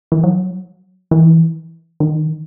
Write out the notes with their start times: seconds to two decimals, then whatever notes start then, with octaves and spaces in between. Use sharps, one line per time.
0.12 E3
0.24 F#3
1.11 E3
2.00 D#3